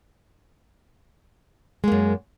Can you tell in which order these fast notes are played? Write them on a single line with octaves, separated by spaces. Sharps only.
G#3 A#3 F#2